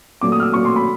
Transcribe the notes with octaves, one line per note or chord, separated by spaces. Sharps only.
A#2 F#3 A3 D6
D#6
F6
E6
A#2 F#3 A3 C#6
C6
B5